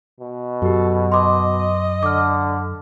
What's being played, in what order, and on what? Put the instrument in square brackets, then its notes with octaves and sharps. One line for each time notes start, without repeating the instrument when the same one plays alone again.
[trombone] B2
[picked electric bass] F#2 [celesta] F#4 G4 [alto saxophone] A4
[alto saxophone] D#5 [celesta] C6 D6
[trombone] D3 [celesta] D6 F6